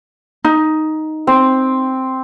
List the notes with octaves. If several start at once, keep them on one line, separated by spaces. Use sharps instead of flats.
D#4
C4